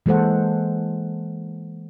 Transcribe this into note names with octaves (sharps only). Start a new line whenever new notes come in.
E3 G#3 A#3 A4 C5 F#5